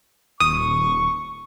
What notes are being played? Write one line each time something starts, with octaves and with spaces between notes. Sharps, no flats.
D#1 C#6 D#6